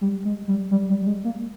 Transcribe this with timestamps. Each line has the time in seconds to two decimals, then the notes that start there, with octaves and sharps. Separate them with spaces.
0.01 G3
0.25 G#3
0.48 G3
0.71 G3
0.90 G3
1.02 G3
1.07 G#3
1.24 A#3